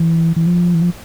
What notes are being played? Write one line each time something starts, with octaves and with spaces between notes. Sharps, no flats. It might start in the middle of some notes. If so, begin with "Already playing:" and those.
Already playing: E3
E3
F3
E3
F3